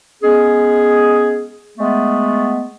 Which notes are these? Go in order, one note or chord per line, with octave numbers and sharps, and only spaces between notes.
G#3 B3 C#4 G#4
G#3 A3 B3